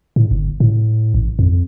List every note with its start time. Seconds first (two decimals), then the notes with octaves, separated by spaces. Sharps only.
0.16 A2
0.31 G1
0.60 A2
1.14 A1
1.39 F2